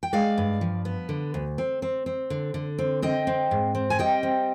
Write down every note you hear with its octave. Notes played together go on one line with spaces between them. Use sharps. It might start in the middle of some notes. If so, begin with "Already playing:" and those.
G5
G#3 D5 F5
G2
F3
B3
D3
D2
C4
C4
C4
D3
D3
C4
C4 D#5 G5
C4
G#2
C4
G#5
G3 D#5 G5
C4